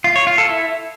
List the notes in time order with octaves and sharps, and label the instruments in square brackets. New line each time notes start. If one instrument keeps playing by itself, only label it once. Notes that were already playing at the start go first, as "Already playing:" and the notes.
[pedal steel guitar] F4
C#5
F4
A4
E4